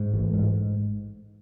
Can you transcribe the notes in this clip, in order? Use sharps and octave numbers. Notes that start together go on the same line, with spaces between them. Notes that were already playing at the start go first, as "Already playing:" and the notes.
Already playing: G#2
A1
G#2